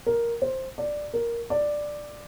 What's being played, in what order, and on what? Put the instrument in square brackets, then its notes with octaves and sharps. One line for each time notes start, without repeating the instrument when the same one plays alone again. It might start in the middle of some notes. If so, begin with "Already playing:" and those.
[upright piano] A#4
C5
D5
A#4
D5